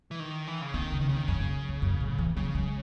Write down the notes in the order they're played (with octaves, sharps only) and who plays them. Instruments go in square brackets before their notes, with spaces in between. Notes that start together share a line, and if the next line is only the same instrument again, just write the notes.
[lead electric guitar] E3
D#3
E3
C#3
[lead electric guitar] D#3 [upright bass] C4
[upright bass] C#3
[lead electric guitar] D#3
[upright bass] E2 [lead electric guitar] C#3
[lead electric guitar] D#3
[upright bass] F#2 [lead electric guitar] C#3
[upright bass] F#2
E2
F#2
A2
E3
[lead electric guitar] C#3 [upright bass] F#3
[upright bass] G#3